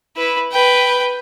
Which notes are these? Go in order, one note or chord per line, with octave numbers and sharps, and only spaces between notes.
E4 B4
B4 G5